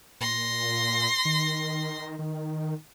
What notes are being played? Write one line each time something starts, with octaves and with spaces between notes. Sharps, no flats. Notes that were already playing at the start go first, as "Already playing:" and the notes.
A#2 C6 A#6
D#3
D#3